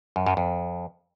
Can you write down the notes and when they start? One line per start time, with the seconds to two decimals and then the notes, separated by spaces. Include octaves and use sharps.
0.16 F#2
0.26 F#2
0.37 F2